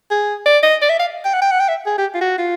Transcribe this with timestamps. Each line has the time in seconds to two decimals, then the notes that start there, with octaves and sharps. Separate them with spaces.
0.11 G#4
0.46 D5
0.63 D#5
0.82 D5
0.89 E5
0.99 F5
1.25 G5
1.34 F#5
1.42 G5
1.51 F#5
1.60 G5
1.69 E5
1.86 G#4
1.98 G4
2.14 F4
2.21 F#4
2.38 F4